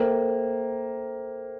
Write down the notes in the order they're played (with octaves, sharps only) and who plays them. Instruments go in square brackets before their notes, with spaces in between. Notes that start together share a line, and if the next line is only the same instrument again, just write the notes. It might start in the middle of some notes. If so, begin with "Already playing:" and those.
Already playing: [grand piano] A#3 [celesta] A4 C5 E5 G5